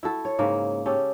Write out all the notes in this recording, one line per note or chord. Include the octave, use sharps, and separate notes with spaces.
E4 F#4 A4
C#5
G#2 C#3 A#3
C#3 C#4 G4 A4